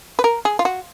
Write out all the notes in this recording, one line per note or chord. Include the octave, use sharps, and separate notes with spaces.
B4
A#4
G#4
F4
F#4